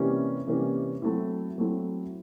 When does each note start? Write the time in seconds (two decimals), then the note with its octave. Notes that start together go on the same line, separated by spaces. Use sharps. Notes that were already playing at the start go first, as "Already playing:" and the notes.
Already playing: C3 E3 G3 A#3 C#4
0.47 C3 E3 G3 A#3 C#4
1.02 F#3 A3 C4 E4
1.58 F#3 A3 C4 E4